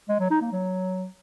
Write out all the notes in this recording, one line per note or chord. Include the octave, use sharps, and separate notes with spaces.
G#3
F#3
D#4
A#3
F#3